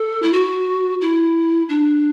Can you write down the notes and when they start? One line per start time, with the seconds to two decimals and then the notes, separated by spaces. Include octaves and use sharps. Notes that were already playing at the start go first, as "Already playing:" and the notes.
Already playing: A4
0.22 E4
0.32 F#4
1.01 E4
1.69 D4